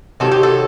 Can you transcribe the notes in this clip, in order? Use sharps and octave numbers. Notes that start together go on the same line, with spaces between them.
C3 D#3 F#3 A4
G4
A4